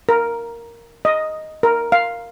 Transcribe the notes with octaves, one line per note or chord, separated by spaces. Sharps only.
A#4
D#5
A#4
F5